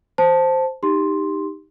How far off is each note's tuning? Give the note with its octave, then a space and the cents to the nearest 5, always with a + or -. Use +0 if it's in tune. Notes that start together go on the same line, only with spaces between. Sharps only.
C5 +0 A5 +0
D#4 +0 G4 +10 C6 +5